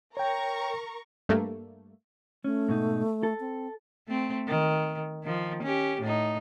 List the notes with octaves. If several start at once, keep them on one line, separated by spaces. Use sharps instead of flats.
A#4 C#5 G5 A#5 C#6
G2 A3 A#3
A3 C#4
G#2 B2 D#4
A4
C4
A3 C4
D#3
D#3 F3
C#4 G4
A2 D#4